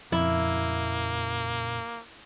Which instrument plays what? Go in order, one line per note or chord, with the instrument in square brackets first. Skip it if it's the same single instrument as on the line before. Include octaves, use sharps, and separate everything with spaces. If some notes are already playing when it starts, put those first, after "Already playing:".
[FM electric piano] F2 [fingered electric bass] A#2 C#3 [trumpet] A#3 [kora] E4